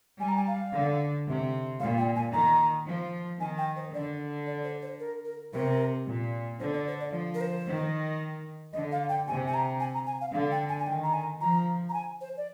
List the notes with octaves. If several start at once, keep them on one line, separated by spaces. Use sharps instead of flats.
G3 G#5
A#5
G#5
F5
D3
C3
A#2 F5
G5
G#5
D#3 A#5
F3
D#3 G#5
G5
C5
D3 D5
D5
C5
C5
A#4
A#4
C3 A#4
A#2
D3 C5
D5
C5
D5
F3
A#4
C5
D#3
D3 D#5
F5
G5
C3 G#5
G#5
A#5
G#5
A#5
G#5
F5
D3 F5
G5
G#5
G#5
D#3 G5
A#5
G#5
F3 A#5
A#5
G#5
C5
D5